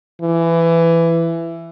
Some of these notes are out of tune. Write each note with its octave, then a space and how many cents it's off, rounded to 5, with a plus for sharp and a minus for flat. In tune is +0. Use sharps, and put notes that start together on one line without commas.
E3 +15